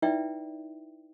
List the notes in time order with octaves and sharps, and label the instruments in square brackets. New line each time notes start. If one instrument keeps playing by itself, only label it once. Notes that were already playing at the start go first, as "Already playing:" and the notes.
[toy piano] D#4 E4 B4 D5 E5 G5